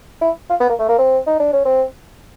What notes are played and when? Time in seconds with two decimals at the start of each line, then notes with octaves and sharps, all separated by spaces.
0.21 E4
0.50 F4
0.60 B3
0.69 A#3
0.79 A3
0.89 A#3
0.98 C4
1.27 D#4
1.40 D4
1.53 C#4
1.65 C4